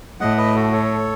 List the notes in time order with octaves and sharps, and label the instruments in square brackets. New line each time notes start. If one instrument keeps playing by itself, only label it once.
[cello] A2 [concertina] D#5 F#5
[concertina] B4 D#5
F#4 A4
A4 C#5